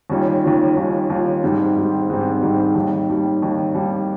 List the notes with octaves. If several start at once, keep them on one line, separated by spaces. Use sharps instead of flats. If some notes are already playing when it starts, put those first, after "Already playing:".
D#2 D#3 G3 C#4 F4
D#2 D#3 G3 C#4 F4
D#2 D#3 G3 C#4 F4
D#2 D#3 G3 C#4 F4
G#2 D#3 G3 C4
G#2 D#3 G3 C4
G#2 D#3 G3 C4
G#2 D#3 G3 C4
D#2 D#3 G3
D#2 D#3 G3
D#2 D#3 G3
D#2 D#3 G3